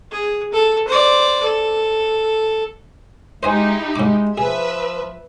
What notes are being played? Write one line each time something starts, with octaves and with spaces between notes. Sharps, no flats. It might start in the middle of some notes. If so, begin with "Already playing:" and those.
G#4
A4
C5 D5
A4
G#3 D#4 E4 G4 C5 D#5 G#5
G#2 G#3 D6
F3 G#4 B4 E5